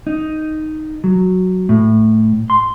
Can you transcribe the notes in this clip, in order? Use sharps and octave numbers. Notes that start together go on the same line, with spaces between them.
D#4
F#3
A2
C6